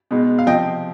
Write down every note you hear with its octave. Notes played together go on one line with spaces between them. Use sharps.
B2 G#3 B3 D#4
F5
C3 F3 D#5 G5